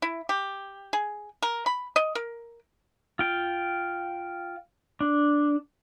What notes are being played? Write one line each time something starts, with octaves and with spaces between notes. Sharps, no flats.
E4
G4
G#4
A#4
B5
D#5
A#4
F4 G5
D4